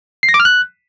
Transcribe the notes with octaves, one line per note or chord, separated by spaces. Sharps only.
C7
A#6
D6
F6
F#6